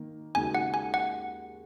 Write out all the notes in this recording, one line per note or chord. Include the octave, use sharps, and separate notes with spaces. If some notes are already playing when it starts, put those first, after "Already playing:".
Already playing: D#3 A#3
D#2 C#3 G#3 D#4 F#4 G#5
F#5
G#5
F#5